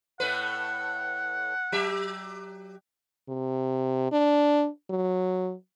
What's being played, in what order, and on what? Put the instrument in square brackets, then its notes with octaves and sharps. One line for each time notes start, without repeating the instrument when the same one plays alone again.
[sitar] A2 A3 B4 [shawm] F#5
[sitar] F#3 G4 E5
[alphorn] C3
D4
F#3